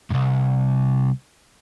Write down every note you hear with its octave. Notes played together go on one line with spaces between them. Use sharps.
C2 G2